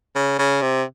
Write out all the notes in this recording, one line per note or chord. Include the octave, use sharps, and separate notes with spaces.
C#3
C#3
C3